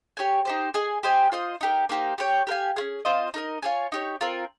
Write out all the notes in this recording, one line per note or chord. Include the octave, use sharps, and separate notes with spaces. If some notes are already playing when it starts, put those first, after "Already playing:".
G4 C#5 G#5
D#4 G4 C5
G#4 D#5 G#5
G4 C5 D#5 G#5
F4 C5 D#5
D#4 G4 A#4
A#3 D#4 G4 C5
G4 C#5 G5
G4 A#4 F5 G#5
C#4 F4 G#4
C4 F4 C5 D#5
D#4 A#4 D#5
F4 G#4 C#5 G#5
D#4 G4 C#5
C4 F4 A#4